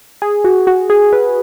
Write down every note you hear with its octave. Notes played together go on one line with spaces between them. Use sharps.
G#4
F#4
F#4
G#4
B4